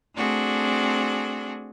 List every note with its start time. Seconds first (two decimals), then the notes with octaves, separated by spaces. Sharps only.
0.15 A3 C4 D4 F#4 G#4